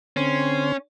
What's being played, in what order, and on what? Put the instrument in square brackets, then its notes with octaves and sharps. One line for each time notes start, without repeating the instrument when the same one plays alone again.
[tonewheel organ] D3 C4 C6 [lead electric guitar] C#4